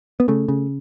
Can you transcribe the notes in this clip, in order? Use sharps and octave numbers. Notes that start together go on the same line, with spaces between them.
B3
C#3 A3
C#3